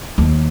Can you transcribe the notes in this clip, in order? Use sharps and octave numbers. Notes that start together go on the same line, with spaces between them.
D#2